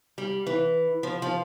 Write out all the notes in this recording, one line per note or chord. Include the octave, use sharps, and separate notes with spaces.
G3
E3
F3
F3